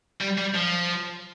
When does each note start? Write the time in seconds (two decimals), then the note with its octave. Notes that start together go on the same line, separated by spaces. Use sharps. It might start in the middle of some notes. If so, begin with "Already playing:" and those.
0.21 G3
0.38 G3
0.55 F3